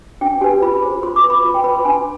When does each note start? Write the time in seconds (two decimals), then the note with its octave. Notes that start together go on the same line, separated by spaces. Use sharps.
0.21 D4 G5
0.41 G4 G#5
0.44 B4
0.62 F4 B5
0.82 G#4 C5
1.03 F4 C6
1.16 D6
1.24 B4
1.30 B5
1.44 F4
1.54 G5
1.64 B4 B5
1.75 C6
1.85 D4 G#5